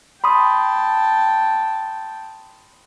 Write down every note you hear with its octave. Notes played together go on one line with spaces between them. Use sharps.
G5 A5 B5 C6 D#6